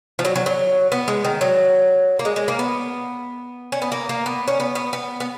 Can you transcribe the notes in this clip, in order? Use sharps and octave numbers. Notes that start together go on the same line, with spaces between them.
F3
F#3
F#3
F#3
B3
G#3
D#3
F#3
A#3
G#3
G#3
A#3
B3
C#4
B3
A#3
A#3
B3
C#4
B3
B3
B3
B3